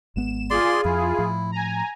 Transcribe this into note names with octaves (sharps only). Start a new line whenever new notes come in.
G#1 G#3 B3 E7
F4 G#4 D5 C6
F2 F3 E4
A2 F3
G#5 A#5